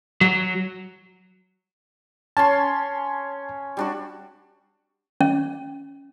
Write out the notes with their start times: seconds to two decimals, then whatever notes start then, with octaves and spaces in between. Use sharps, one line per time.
0.21 F#3
2.37 C#4 C#5 A5 C6
3.77 G3 D4 F#4
5.21 C#4